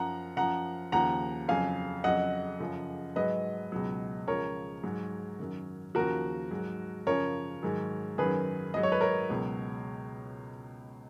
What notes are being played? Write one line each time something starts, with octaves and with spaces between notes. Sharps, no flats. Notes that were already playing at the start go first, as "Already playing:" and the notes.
Already playing: F#2 F3 F#5 A#5
F#2 F3 F#5 A#5
D#2 C#3 F3 F#5 A#5
F2 C#3 F#3 F5 G#5
F2 C#3 F#3 D#5 F#5
F#2 C#3 F3
G#2 F#3 B4 D#5
C#2 B2 F#3
C#2 C#3 F3 A#4 C#5
G#2 F#3
F#2 D#3 F#3
D#2 C#3 F3 F#4 A#4
G#2 F#3
F#2 C#3 F3 A#4 C#5
G#2 D#3 F#3
F#2 D#3 F#3 G#4 B4
G#2 F#3 D#5
C#5
B4
A#4 C#5
C#2 B2 F#3